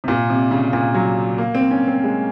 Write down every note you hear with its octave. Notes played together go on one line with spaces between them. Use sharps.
C3
A#2
C3
C#3
A#2
F#3
A#3
C4
C#4
C4
G#3